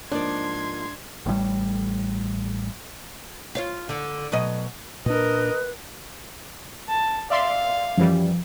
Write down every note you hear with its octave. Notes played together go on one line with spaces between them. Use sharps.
G#2 F3 A#3 D4 D#4 D5 C6 G#6
A1 A2 C#3 G3
F4 C#5 F5
D3
B2 F#3 D#5
A#2 D4 A#4 B4 D#5
A5
D5 E5 F5 C6
F#2 E3 F3 G3